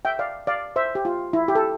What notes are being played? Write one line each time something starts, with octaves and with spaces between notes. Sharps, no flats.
E5 G5
D5 F5
D5 F5
C5 E5
G4
F4
E4
G4
A4